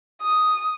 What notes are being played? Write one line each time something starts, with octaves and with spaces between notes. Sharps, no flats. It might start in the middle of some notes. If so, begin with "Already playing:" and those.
D#6